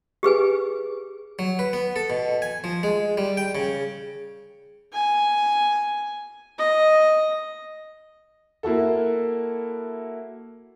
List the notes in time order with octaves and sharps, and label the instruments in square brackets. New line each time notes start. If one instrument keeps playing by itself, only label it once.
[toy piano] G4 G#4 B4 G#5
[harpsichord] F#3
B4
B3
A4
B2
G#5
F3
G#3
G3
G5
C#3
[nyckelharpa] G#5
D#5
[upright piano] A#3 E4 F#4 A4